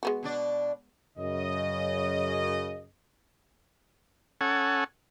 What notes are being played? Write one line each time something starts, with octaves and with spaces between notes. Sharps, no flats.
G#3 B3 F#4
B2 D4 D5
F#2 C#3 D#5
C#4 A4 F#5 G#5